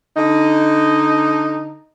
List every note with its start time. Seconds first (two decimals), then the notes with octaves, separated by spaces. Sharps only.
0.17 D3 D#4